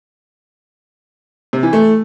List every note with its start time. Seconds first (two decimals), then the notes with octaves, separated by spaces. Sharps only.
1.53 C3
1.63 E3
1.73 A3